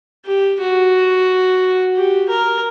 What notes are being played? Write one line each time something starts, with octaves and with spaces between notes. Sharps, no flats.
G4
F#4
G4
A#4